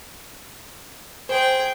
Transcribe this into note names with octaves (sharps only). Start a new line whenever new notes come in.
G#4 C5 G5